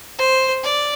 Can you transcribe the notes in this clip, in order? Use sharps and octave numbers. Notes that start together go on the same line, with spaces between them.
C5
D5